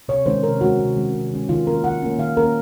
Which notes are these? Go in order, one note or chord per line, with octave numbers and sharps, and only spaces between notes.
C3 C#5
D#3 G#3 C#4 C5
C3 A#4
D#3 G#3 C#4 F#4
C3
D#3 G#3 C#4
C3
D#3 G#3 C#4
D#3 F4
A#3 C#4 A#4
D#3 F#5
A#3 C#4
D#3 F5
A#3 C#4 A#4